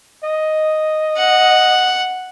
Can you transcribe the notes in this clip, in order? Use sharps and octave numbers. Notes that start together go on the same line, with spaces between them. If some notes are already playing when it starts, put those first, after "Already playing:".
D#5
F#5